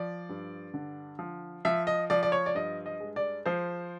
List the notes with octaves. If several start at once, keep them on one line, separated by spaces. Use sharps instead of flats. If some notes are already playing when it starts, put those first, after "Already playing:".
Already playing: F3 D5
G2
D3
F3
F3 E5
D#5
F3 D5
D5
C#5
D5
G2 D#5
D#5
G#3
D5
F3 C5